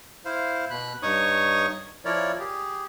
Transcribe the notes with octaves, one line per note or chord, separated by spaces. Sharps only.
E4 C5 F5
B2 B5 F#6
G2 D#4 C#5 C#6 D#6
F3 E4 A#4 C#5 D5
G4 G#4